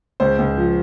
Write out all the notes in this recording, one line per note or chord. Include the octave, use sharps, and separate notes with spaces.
C#2 C5
C#2
F3